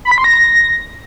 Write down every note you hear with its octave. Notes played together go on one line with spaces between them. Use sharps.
B5
B6
C6
A#6